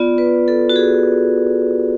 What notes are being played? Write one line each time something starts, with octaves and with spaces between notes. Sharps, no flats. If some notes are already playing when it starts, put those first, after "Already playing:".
Already playing: B3 F4 D5
B4
A4
F#4
G#4